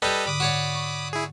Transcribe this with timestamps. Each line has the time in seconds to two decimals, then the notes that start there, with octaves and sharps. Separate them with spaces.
0.02 G3 G4 A4 B4 D#5
0.26 G#2 D3 B5 D6 D#6
0.40 F#4 C#5 D5
0.75 C#6
1.13 E4 G#4